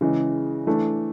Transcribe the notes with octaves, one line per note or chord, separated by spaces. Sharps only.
C#3 E3 G#3
E3 A3 D4